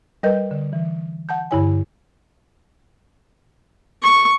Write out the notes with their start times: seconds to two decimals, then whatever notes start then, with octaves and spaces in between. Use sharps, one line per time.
0.23 G3 A#4 B4 D#5 G6
0.51 D3
0.73 E3
1.29 F#5 A5 G6
1.51 G2 D3 E4 C#5 G#5
4.03 C#6